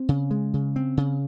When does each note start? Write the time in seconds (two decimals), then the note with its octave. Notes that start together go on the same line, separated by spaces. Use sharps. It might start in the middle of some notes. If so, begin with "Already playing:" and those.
Already playing: C4
0.09 C#3
0.31 G#3
0.54 C#3
0.76 C4
0.97 C#3